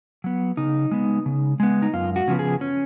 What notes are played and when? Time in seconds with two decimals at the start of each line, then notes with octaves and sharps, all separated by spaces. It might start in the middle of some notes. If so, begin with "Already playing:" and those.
0.24 F#3 B3
0.57 C#3 D#4
0.91 G#3 B3
1.26 C#3
1.60 G#3 B3
1.82 D#4
1.94 F#2 F4
2.16 F#4
2.28 C#3 F3 B3
2.39 G#4
2.61 C#4